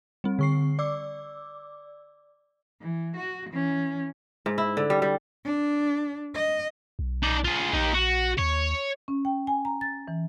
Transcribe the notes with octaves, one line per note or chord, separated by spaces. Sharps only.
G3 C4
D3 C#6 C7
D5 D6 E6
E3
F#4
E3 C#4
G#2
E4
D3
G3
G3
D4
D#5
B1
D#4 D5
F4 G#4
A#1 D#4 G4
F#4
D#2 C#5
C#4
G5
G#5
A#5
A6
E3